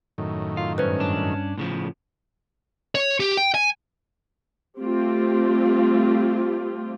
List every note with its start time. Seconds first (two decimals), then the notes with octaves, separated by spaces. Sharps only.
0.18 F#2 A2 D#3
0.57 F4
0.78 G2 C#4 B4 C5
1.00 D4
1.58 A2 C#3 F3
2.95 C#5
3.20 G4
3.37 G5
3.55 G#5
4.78 G3 A3 C4 F4 G4